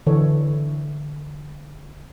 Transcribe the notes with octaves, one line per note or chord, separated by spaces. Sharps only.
D3 E3 A4 C#5